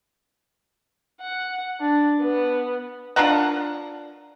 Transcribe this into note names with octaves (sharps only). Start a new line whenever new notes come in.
F#5
D4
B3
D4 F4 A#4 F#5